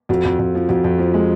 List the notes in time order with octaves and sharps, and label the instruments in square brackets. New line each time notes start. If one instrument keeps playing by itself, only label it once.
[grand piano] F2 [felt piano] F#4
[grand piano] F2
F2
F3
[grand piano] F2 [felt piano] F#4
[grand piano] F2
F3
G#3